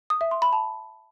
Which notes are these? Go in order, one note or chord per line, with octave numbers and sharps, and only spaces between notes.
D#6
E5
C6
B5
A5